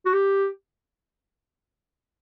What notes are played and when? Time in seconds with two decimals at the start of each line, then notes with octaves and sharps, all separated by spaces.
0.06 F#4
0.13 G4